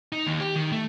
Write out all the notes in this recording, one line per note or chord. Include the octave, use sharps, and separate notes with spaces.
D#4
D#2
G4
D#3
A3